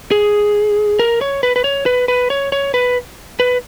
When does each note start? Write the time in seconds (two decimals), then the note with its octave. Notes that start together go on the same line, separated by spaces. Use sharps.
0.11 G#4
0.99 A#4
1.21 C#5
1.43 B4
1.56 B4
1.64 C#5
1.86 B4
2.08 B4
2.30 C#5
2.52 C#5
2.74 B4
3.40 B4